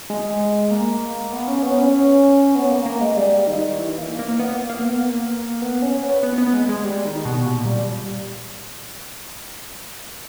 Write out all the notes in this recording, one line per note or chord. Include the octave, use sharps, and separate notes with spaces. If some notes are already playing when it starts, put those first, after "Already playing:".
G#3
A#3
B3
C#4
B3
C#4
B3
A#3
A#3
G#3
G3
D#3
E3
A#3
A#3
B3
A#3
A#3
B3
A#3
B3
C#4
B3
B3
B3
G#3
G#3
G3
D#3
B2
A#2
G3